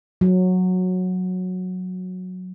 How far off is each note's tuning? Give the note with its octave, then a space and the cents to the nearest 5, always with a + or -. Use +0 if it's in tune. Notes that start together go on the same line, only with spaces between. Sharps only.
F#3 -10